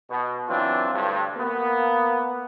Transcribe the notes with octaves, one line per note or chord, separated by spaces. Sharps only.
B2
E3 F#3 C4 D4 F4
D2 G2
A#3 B3